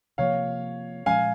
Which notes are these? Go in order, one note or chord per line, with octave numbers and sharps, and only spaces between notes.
C3 F3 A#3 C#5 F5
A#2 F3 G#3 C#4 F5 G#5